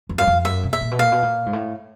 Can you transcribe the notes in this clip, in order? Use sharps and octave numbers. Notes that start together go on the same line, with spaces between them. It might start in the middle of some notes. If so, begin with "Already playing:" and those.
F2
F#2 F5
F2
F#2 E5
C3
E5
A#2
B2
A#2 F5
B2
A#2
G#2
A2